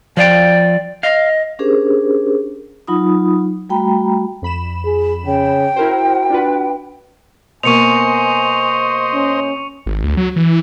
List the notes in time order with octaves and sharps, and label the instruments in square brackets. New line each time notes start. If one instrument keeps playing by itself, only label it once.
[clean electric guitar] F3 F5 G5 [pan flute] D5
[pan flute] D#5 [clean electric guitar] F5
[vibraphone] C#4 D4 G4 G#4 A#4 C5
F#3 D#4 F4 B5 D#6
G3 A3 F#4 G5 A#5 B5
[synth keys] F2 B5 E7
[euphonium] G#4
[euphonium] C#3 [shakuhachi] G5
[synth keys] E4 A#4 C5 [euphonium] F#4
[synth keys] D4 F4 B4
[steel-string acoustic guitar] B2 A#3 [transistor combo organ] C5 D#5 [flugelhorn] G#5 [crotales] C#6 C#7 F7
[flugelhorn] C#4
[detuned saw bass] G#1
D2
F#3
E3